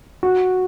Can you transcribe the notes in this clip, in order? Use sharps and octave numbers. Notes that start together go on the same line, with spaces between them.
F#4